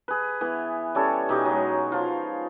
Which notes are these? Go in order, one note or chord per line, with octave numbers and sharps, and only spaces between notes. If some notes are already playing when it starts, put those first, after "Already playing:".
G#4 B4
E3 B3
G3 C#4 A4 C#5
B2 D#4 G4 G#5
F#3 G#3
F3 F4